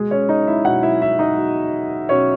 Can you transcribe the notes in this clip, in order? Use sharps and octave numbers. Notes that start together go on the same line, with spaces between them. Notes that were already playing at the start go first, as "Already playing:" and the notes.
Already playing: B2 G#3 G#4
C#4 C#5
D#4 D#5
E4 E5
B2 F#4 F#5
E4 E5
E4 E5
D#4 D#5
B2
B2 C#4 C#5